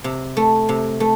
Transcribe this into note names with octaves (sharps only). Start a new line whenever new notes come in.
C3
A3
C3
A3